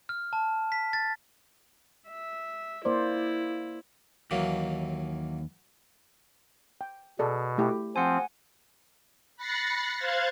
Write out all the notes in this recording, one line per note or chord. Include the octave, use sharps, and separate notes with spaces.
F6
A5
B6
A6
E5
A#3 E4 C5 D5
D#2 E3 F#3 A#3
G5
B2 G#4 A4 D5
A3 E4 G4
F3 C4 F#5 G#5
B5 F#6 A6 A#6 C7 C#7
C5 F5 F#6 G#6 A6